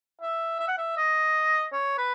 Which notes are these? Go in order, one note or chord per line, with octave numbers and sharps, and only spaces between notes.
E5
E5
F#5
E5
D#5
C#5
B4